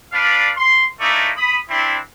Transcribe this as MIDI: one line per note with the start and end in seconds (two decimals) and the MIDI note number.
0.12 0.50 62
0.12 0.50 71
0.12 0.50 74
0.12 0.50 77
0.56 0.86 84
1.00 1.31 57
1.00 1.31 58
1.00 1.31 63
1.00 1.31 64
1.00 1.31 74
1.37 1.58 83
1.37 1.58 87
1.69 1.97 60
1.69 1.97 62
1.69 1.97 64